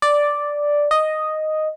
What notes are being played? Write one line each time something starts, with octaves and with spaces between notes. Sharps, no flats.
D5
D#5